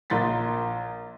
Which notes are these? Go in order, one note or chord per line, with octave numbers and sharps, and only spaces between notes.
A#1 A#4 C6 A6 B6